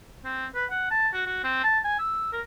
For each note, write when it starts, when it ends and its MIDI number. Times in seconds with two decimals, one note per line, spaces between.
0.25 0.46 60
0.55 0.65 71
0.70 0.87 78
0.91 1.08 81
1.14 1.23 66
1.26 1.43 66
1.44 1.61 60
1.63 1.80 81
1.84 1.96 80
1.99 2.29 88
2.33 2.41 70